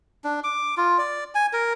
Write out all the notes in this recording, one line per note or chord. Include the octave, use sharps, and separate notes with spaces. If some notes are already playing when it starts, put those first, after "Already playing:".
D4
D6
F4
D5
G#5
A#4